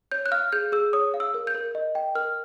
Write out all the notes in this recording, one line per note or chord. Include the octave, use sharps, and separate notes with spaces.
C#5 G6
F#6
F5 F6
G#4 G6
G#4 E6
C#5 D#6
F5
E6
A#4
G6
A#4
D#5
G5
A#4 F6